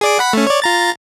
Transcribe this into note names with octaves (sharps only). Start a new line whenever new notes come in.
G#4 D5 D6
F#5 B5 B6
A3 C#4
C#5 D5
F4 A#5 A6